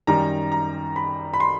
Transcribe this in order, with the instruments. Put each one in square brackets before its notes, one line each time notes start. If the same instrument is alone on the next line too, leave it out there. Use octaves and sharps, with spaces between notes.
[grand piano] F#2 D#3 G3 A#5
A#5
B5
B5
C6